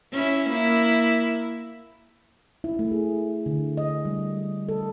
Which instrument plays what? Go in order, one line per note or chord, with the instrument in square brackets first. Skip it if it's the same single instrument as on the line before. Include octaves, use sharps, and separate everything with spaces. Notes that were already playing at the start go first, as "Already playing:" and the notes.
[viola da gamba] C#4 E4
A#3 E4
[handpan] E4
A3
G#4
D3
D#5
G3
A4